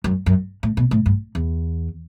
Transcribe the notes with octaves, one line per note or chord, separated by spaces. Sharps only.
F#2
F#2
A2
B2
A2
G2
E2